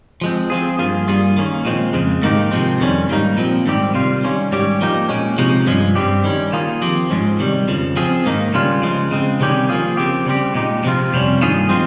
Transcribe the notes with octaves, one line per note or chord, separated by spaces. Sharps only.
F3 G#3 C4
F3 C4 F4 G#4
G2 F3 A#3 F4 G#4
G2 G3 A#3 F4 G#4
D#3 A#3 C#4
A#2 F3 G#3 C4
F2 C#3 G#3
G#2 D#3 A#3 D#4 G4
C3 F3 G#3 C4
F2 D#3 G3 C#4
G#2 G3 A#3 D#4
A#2 F3 C4
G#2 D#3 G3 C4 G4
C3 G3 C4 F4
D#3 G3 C#4
G#2 G3 C#4 G4
F3 A#3 D#4 G4
A#2 G#3 C#4
C3 F3 G#3 D#4
G2 F3 G#3 C#4
G2 G3 C4 G4
D#3 G3 C#4
D#3 A#3 F4 G#4
F3 C4 G4
G#2 F3 G#3 C#4
C3 D#3 G3
F2 C#3 F3
F3 C4 F4 G#4
G#2 D#3 A#3 D#4
C#3 G3 C#4 F4
C#3 F3 G#3
C#3 G#3 C4
C3 D#3 G3 C#4 G4
F3 A#3 F4 G#4
C#3 F3 C4 G4
C#3 G3 C4 G4
A#2 G#3 D#4 G4
C3 F3 C4 F4
F2 C3 G3 C#4
G2 D#3 A#3 F4 G#4
F3 G#3 C4 F4